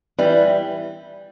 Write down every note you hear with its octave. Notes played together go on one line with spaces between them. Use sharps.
E3 G3